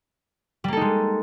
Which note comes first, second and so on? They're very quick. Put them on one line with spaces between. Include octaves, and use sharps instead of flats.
G3 A#3 A4 D#4 G#3